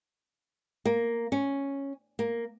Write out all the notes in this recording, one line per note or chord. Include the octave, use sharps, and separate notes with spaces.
A#3
C#4
A#3